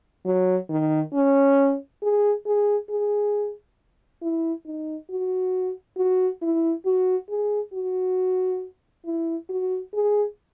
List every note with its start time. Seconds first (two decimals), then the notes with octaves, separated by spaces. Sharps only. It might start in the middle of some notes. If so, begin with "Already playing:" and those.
0.26 F#3
0.70 D#3
1.14 C#4
2.02 G#4
2.46 G#4
2.90 G#4
4.22 E4
4.66 D#4
5.10 F#4
5.97 F#4
6.42 E4
6.86 F#4
7.30 G#4
7.74 F#4
9.05 E4
9.49 F#4
9.94 G#4